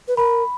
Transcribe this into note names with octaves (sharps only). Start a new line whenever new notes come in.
B4
A#4 B5